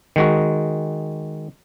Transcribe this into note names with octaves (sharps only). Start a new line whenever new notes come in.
D#3 G#3 F#4